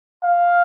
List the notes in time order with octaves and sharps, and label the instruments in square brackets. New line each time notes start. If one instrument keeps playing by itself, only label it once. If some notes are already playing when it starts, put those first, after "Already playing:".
[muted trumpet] F5